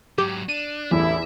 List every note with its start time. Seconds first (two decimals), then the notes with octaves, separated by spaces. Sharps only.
0.18 G#2 F#3 G4
0.49 D4 D#7
0.91 A1 E2 D3 E4 E5